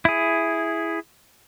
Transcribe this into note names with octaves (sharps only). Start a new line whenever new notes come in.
E4 G#4